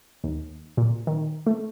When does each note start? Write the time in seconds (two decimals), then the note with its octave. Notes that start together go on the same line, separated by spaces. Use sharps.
0.24 D#2
0.77 A#2
1.07 D#3
1.46 A3